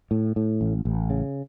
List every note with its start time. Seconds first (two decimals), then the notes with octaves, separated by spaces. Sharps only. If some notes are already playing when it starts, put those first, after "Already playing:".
0.11 A2
0.36 A2
0.61 A1
0.85 A1
1.10 C#3